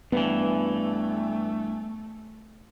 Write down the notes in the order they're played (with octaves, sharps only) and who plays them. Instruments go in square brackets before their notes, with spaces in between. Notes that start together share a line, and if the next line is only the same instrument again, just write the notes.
[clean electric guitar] G2 E3 [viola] A3 [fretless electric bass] B3